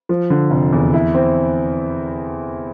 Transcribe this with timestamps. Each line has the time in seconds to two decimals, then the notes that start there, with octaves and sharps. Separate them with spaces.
0.09 F3
0.30 D3
0.51 F1
0.73 E2
0.93 E4
1.14 C4